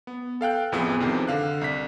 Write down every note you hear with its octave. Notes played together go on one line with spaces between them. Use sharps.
B3
A4 F5 G5 F#6
A1 F2 E3 B3 G#4
F2 C3 D#3
D3 F5 F#6
C2 B6